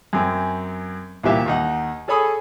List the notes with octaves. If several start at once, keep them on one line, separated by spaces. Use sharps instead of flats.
F#2 C4 G#5
C2 A#2 E3 G4 E5 F5
D#2 D#4 F#5
G#4 A4 C#5 G#5 B5 D#6